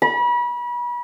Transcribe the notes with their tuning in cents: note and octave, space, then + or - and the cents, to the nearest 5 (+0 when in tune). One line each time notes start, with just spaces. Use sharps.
B5 -35